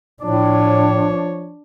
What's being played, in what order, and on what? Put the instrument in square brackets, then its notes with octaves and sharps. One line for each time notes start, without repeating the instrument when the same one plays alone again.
[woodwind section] A2 [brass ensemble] F3 C#5 [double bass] D4